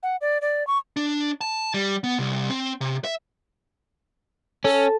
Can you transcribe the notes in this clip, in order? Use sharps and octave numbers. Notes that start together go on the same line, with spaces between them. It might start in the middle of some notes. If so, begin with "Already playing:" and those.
F#5
D5
D5
C#6
D4
A5
G3
B3
C2
C4
C3
E5
C#4 A4